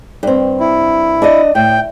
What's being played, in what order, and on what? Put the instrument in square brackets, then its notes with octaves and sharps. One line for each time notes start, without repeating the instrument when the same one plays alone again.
[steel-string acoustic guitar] G2 C4
[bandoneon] E4
[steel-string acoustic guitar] D4 D5 D#5
[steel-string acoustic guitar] A2 [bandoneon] G5